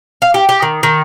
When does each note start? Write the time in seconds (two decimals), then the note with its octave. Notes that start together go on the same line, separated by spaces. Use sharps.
0.22 F5
0.34 G4
0.49 G4
0.62 D#3
0.83 D#3